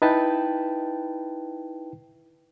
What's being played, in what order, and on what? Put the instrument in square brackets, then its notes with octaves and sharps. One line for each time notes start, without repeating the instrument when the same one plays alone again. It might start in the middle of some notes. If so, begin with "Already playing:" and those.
[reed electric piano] D#4 E4 B4 G5 A5